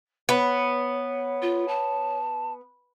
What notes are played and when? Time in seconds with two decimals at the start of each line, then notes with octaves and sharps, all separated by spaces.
0.29 B3 C#5
1.42 F4
1.68 A5